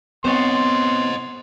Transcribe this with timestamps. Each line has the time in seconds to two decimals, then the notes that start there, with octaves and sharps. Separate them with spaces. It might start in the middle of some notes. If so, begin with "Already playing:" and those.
0.25 B3 C4 C5 C#5 D#5 C6